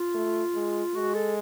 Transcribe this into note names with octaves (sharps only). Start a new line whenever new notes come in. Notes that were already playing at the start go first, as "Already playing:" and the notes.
Already playing: F4
A3
G#3
G#3 F#4
A4